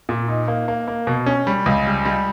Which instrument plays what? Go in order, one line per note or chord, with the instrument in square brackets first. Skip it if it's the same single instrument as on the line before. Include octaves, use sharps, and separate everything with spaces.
[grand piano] A#2
D#4
A#3
A#3
A#3
B2
C#4
G3
C#2
G3
G3